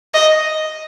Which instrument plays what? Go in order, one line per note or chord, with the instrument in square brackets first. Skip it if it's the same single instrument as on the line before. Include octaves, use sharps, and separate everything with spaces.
[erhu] D#5